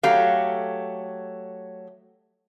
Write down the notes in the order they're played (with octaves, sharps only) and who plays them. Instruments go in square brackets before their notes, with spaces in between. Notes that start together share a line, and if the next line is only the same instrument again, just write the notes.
[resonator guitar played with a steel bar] F#3 A3 G4 F5